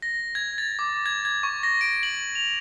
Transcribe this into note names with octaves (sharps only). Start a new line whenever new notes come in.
A#6
G#6
A6
D6
G#6
G#6
C#6
A#6
D7
F#7
F7